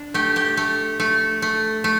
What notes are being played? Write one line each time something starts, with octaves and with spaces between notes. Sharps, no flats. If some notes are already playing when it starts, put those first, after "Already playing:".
Already playing: D4
A3 G4
G4
A3
A3
A3
A3